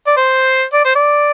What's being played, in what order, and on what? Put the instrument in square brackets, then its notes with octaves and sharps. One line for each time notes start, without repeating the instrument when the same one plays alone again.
[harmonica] D5
C5
D5
C5
D5